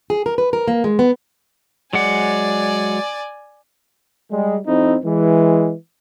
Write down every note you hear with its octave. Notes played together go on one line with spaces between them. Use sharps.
G#4
A#4
B4
A#4
A#3
G#3
B3
F#3 G#3 D5 F#5 G#5
G3 G#3
F2 C4 D#4 E4
E3 G#3